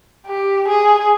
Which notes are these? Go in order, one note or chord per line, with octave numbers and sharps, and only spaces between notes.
G4
G#4